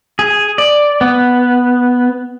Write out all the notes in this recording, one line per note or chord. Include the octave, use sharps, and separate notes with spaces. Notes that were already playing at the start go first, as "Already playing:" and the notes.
G#4
D5
B3